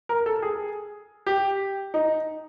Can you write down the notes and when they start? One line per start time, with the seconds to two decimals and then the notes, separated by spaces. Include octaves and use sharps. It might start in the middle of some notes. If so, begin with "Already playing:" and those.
0.09 A#4
0.26 A4
0.42 G#4
1.26 G4
1.94 D#4